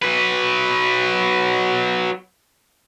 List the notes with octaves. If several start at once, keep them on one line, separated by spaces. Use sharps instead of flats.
F#3 B4